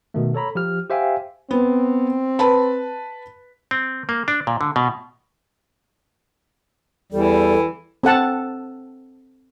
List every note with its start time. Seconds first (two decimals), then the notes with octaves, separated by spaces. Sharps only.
0.14 B2 D#3 A3
0.34 A4 C#5 A#5 B5
0.55 F3 G4 F6
0.90 G4 C5 E5 F5 G5 G#5
1.51 B3 C4
2.39 B4 A5 B5
3.71 C4
4.09 A#3
4.28 D4
4.47 A#2
4.61 D3
4.76 B2
7.12 E2 E3 G3 A4
8.03 C4 A4 F#5 A5